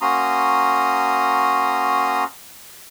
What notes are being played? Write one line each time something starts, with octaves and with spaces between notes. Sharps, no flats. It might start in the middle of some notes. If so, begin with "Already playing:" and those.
A#3 C#4 F#4 A#5 C6 D#6